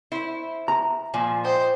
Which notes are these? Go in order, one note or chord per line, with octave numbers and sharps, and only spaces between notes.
E4 C5 C#6
A#5
A#2 F3 G#4
C5 D#5 G5